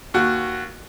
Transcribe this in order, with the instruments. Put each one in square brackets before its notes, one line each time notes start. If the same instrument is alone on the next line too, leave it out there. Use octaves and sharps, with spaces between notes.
[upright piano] D#2 F#4